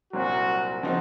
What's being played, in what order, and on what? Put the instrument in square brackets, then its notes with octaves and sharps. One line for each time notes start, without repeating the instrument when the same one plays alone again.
[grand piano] C2 A#2 F#3 C4 [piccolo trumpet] F#4
[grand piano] C#3 F3 C4 D#4 F#4